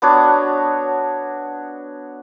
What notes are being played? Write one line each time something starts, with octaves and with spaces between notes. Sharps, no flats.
B3 D4 F#4 C#5